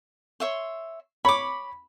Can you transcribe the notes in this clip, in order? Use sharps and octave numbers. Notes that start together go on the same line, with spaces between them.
C#5 E5 C6
C#5 B5 D6